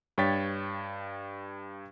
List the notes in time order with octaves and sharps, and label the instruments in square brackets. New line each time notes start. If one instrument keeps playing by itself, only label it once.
[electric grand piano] G2 C#5 G5 A6 B6